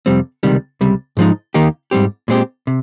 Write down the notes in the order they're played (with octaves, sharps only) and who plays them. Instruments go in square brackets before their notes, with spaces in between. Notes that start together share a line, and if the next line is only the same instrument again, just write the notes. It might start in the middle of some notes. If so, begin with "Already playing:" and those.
[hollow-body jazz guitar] F2 C3 G3 C4
C#2 C3 D#3 G3
C#2 C3 G3
G#2 F3 G#3 D#4
D#2 D#3 A#3 D#4 G4
G#2 G3 C4 G4
A#2 G#3 C4 G4
C3